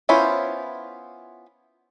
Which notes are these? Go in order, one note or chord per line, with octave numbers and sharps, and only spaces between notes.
B3 C#4 E4 F4 C5